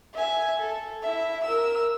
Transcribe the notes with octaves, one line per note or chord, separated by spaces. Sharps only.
E5 G#5
A4
E4 E5
A#4 E6